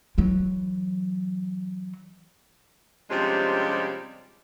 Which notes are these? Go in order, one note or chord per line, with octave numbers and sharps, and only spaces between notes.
E3 F#3
C3 F3 G3 G#3 C#4 D4